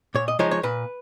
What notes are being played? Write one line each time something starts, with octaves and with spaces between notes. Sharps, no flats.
A#2 C#5
D#5
F3 G#3 D#4 C#5
C#5
A#2 B4